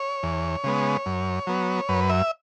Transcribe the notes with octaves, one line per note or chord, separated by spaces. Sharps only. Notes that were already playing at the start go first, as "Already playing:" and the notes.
Already playing: C#5
E2
C#3 G#3 B3
F#2
F#3 B3
F#2 B4
E5